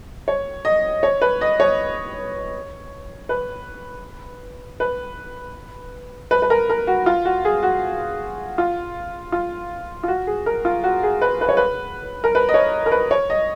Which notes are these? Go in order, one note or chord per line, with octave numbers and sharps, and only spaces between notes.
C#5
D#5
C#5
B4
D#5
C#5
B4
B4
B4
B4
A#4
A#4
F#4
F4
F#4
G#4
F#4
F4
F4
F4
F#4
G#4
A#4
F4
F#4
G#4
B4
B4
C#5
B4
A#4
B4
D#5
C#5
A#4
B4
C#5
D#5